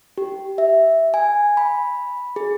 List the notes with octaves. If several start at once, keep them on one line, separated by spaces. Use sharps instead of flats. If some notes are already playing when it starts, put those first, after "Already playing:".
G4
E5
G#5
B5
G#4